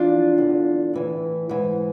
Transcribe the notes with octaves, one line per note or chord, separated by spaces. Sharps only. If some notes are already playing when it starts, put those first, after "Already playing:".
Already playing: F2 E3 D4 F4
E2 D3
A2 E3
G#2 E3